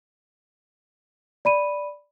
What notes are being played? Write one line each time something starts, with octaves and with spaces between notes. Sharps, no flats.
D5 B5 D#7